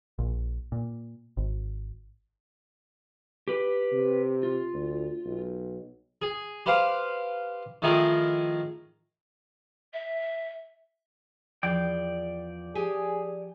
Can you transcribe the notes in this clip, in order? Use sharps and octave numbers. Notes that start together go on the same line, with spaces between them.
A#1
A#2
G#1
G4 B4
C3
F4
D2
B1
G#4
G4 B4 C5 F5 D6
D#3 F3 A3 E4 G#4 A#4
E5
E2 F3 D5 F5 G5
F3 G4 G#4 G#5